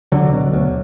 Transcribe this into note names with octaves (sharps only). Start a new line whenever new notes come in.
C#2 D3 F#3
B2
D2